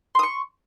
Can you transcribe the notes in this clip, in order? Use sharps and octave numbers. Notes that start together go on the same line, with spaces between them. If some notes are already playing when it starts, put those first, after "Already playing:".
C6 C#6 D#6